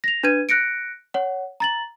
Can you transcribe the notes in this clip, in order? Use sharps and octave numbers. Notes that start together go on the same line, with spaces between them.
A#6 F7
D4 B4 G#6 D#7
F#6 A#6 C#7 D7
C#5 F#5
A#5 A6 F#7